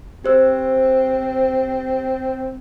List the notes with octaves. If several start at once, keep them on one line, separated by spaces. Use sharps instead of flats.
C4 G4 C5 E6